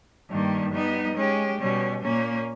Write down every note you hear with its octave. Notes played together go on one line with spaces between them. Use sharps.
G2 D#3 G3 A#3
G3 B3 D#4
G#3 C#4 G4
B2 G3 C#4
A#2 A#3 C#4